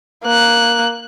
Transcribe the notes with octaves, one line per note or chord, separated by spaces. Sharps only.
A#3 F#6